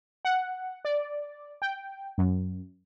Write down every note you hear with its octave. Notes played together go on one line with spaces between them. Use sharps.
F#5
D5
G5
F#2